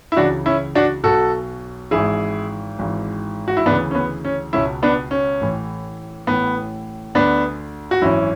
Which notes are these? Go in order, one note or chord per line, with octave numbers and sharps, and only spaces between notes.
E4
C#2 C#3 E3 D4 F#4
C#4 E4
D4 F#4
B1 B2 F#4 A4
G#1 G#2 E3 E4 G#4
G#1 G#2 E3
F#4
E4
D2 C#3 E3 B3 D4
C#4
B3
C#4
C#2 B2 C#4 E4
B3 D4
C#4
A1 A2 E3
A1 A2 E3 B3
D2 D3 B3 D4
F#4
G#1 F#2 E3 C#4 E4